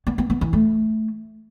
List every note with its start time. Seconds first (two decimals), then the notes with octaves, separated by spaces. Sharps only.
0.07 B3
0.18 B3
0.30 B3
0.41 E3
0.53 A3